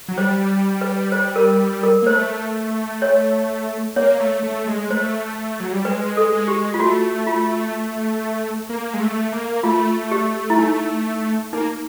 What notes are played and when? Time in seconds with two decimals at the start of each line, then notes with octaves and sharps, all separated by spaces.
0.08 F#3
0.17 G3 C5
0.81 B4
1.12 C5
1.36 A#4
1.83 A#4
2.02 A#3
2.07 A3 C5
3.02 C#5
3.96 A#3 C#5
4.20 A3
4.43 A3
4.67 G#3
4.90 A3 C5
5.60 F#3
5.72 G3
5.85 G#3 B4
6.17 A4
6.32 G#3
6.48 G4
6.74 G#3 F4
6.80 A3 F#4
7.27 F4
8.70 A#3
8.94 G#3
9.00 A3
9.32 A#3
9.63 A3 F4
10.11 G4
10.50 E4
10.59 D#4
11.53 A#3 D#4